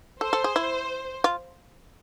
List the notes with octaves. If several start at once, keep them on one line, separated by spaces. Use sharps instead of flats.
A4 C5
A4
G#4
E4
F4